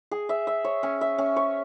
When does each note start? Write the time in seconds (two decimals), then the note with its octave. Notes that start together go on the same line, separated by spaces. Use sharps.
0.11 G#4
0.29 E5
0.47 E5
0.64 C#5
0.83 C#4
1.01 E5
1.18 C#4
1.36 C#5